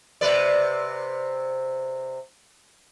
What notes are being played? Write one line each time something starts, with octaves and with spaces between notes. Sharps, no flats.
C3 B4 D5